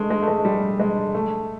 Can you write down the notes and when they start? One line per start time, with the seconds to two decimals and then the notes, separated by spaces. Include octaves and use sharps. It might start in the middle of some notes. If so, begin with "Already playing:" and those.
Already playing: G#3 A3
0.10 G#3
0.22 A3
0.28 G#3
0.45 G3
0.80 G#3
1.14 A3